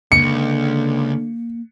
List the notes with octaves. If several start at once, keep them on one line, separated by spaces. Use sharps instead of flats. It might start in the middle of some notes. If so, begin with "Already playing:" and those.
C#2 D3 A#3 C#7